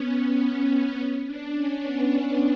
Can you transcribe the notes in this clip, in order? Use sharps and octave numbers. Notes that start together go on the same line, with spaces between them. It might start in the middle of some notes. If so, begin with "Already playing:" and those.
Already playing: B3 C#4
C#4
D4
C#4
B3
D4